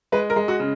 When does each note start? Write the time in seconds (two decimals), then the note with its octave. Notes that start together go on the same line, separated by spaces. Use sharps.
0.12 G#3 B4
0.30 A#4
0.36 G#3
0.48 F#4
0.60 C#3